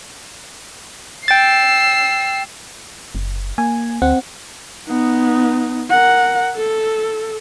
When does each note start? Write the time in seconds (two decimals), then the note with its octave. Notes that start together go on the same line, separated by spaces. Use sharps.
1.28 G5 E6 A6 C7
3.15 F#1
3.58 A#3 G#5
4.02 D2 C4 F#5
4.87 B3 D#4
5.90 A#4 F#5
6.56 A4